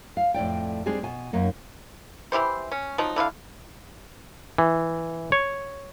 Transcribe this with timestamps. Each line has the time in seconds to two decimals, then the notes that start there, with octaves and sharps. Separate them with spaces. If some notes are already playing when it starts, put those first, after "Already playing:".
0.17 F5
0.34 F2 A2 D5 G5
0.86 G3 G#3 C4 D4 G#4
1.03 B2 G#5
1.33 F#2 A#3 D#4
2.32 E3 E4 G4 C5
2.72 C#4
2.98 F3 F#3 D#4
3.16 D3 E4 F#4 F5
4.58 E3
5.32 C#5